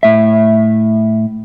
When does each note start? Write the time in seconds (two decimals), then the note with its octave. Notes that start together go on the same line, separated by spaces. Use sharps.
0.03 A2 E5